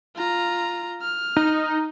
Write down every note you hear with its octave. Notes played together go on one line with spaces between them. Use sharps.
F4 A#5
F6
D#4